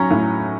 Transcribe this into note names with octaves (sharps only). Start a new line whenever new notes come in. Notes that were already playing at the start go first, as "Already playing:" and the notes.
Already playing: F#3 C#4 A#5
A2